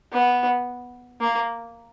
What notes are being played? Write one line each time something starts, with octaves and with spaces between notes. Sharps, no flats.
B3
A#3